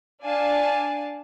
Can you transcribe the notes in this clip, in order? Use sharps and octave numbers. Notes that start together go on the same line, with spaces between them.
D4 D5 F5 G#5 A5